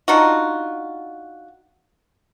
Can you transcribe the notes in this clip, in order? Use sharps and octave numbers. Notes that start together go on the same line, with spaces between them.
D4 D#4 F4 F#4